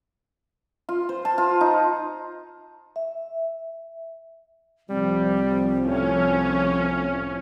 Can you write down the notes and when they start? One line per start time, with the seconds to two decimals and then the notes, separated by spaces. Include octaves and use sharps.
0.89 F4
1.09 C5
1.25 A5
1.38 F4
1.61 D#4
2.96 E5
4.89 C2 F3 G3 C4
5.87 A2 C#4